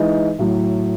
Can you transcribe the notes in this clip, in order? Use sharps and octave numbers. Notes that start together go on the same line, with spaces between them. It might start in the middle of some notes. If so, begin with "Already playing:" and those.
Already playing: E3 G#3 D#4
A2 F#3